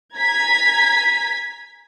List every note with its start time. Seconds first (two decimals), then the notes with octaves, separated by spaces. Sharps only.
0.17 G#5 A#5 G#6 B6